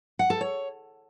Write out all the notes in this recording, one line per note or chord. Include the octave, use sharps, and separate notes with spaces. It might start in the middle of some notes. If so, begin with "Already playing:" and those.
F#5
A4
C#5